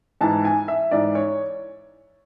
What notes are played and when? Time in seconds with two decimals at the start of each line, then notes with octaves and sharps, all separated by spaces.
0.21 G#2 E3 A5
0.45 G#5
0.68 E5
0.91 G#2 E3 D5
1.15 C#5